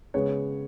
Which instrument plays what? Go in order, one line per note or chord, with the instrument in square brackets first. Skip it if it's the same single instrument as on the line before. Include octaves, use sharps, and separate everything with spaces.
[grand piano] C#3 G#3 B3 C#5